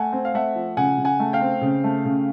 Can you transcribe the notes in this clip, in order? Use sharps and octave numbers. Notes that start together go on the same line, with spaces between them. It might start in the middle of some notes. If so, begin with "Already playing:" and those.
Already playing: A3 F#5 G#5
C4
F5
A3 E5 F#5
F3
C#3 F#5 G#5
C#3
F#5 G#5
A3
F5 G5
C4
C#3
A3
C#3